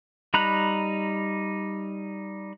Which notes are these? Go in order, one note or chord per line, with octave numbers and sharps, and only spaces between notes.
G3 D#4 A#5 B5 F#6